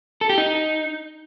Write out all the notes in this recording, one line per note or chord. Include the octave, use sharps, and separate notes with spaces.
A4
G4
D#4